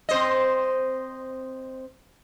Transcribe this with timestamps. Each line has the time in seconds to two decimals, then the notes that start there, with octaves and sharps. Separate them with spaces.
0.09 C4 C5 D#5